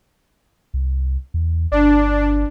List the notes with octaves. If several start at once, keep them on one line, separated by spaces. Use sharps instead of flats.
C2
E2
G1 D4